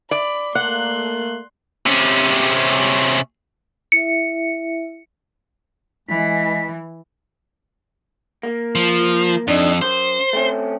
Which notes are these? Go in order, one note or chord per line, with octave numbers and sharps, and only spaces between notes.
D5 B5
A3 A#3 F#5 C6 F#6
C3 C#4
E4 E5 C#7
E3 G#3 B6
A#3
F3
F2 D4 D#4
F#2 C5
A3 C4 C#4